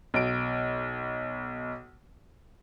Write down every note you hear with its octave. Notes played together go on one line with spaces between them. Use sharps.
B1 D7